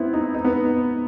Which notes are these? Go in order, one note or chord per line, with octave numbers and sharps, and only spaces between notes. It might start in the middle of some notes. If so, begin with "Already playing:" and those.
Already playing: B3 C4 E4
D#4
D#4
B3